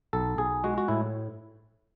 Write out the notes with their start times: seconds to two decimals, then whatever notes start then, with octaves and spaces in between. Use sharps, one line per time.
0.13 B1 A4
0.38 B1 G#4
0.64 G#3 F#4
0.78 F#4
0.88 A2 E4